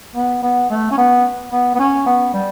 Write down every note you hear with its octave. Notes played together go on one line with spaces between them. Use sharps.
B3
B3
A3
C#4
B3
B3
B3
C#4
B3
G3